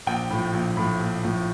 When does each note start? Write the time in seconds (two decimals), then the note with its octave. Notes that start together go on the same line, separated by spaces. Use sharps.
0.07 A#1 G5
0.31 A2 F3
0.53 A#1
0.77 A2 F3
1.00 A#1
1.23 A2 F3